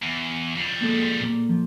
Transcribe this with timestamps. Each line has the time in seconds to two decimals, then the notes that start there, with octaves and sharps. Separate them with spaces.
0.02 E2
0.55 F2 G3
0.81 G#3 A#3 A4
1.20 A#2 A#3
1.49 F3